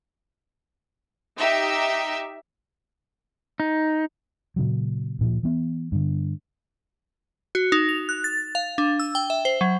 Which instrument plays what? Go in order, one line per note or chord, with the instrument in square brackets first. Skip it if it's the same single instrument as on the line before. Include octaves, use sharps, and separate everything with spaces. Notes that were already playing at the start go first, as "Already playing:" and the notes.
[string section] D#4 G4 E5
[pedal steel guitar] D#4
[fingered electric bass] A#2 C#3 F#3
D1 A#2 F3
E3 B3
G2 D3
[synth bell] F#4
D#4
F7
F#6
A6
F5
D4
E6
G5
E5
C5
F#3